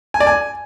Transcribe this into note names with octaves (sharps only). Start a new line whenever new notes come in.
G#5
D5
G#5